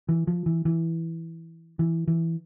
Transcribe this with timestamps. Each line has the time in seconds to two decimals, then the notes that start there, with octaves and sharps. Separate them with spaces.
0.09 E3
0.27 F3
0.46 E3
0.65 E3
1.79 E3
2.08 E3